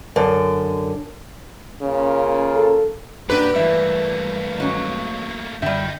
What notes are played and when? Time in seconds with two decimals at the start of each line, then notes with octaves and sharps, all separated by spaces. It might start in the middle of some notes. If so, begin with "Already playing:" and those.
0.16 F#2 D3
1.82 C#3 A#3 C#4 F4
2.55 A4
3.30 C2 G2 A#2 A#3 D4 F#4 G4 B4
3.56 G2 E3 A3 A#3 E5
4.58 D#3 F#3 C#4
5.62 F#2 D3 G3 D#5 E5 G5